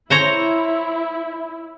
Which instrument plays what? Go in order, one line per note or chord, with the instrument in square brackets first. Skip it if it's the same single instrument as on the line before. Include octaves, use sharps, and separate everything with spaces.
[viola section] E4 [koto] C5 C#5 A#5